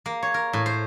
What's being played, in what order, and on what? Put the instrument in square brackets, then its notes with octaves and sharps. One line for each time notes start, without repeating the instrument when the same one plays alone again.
[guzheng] A#3
C#5
A#4
A2
C5